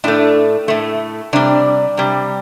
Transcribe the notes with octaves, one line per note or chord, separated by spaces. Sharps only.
A2 A3 D4
A2 A3
C3 G3 D4
C3 G3